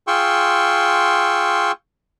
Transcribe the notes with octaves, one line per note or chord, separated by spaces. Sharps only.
F4 G#4 G5 C6 C#6 E6